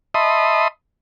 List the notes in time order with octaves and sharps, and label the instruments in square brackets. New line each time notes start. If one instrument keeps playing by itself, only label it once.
[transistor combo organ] D#5 E5 A5 B5 C6 D#6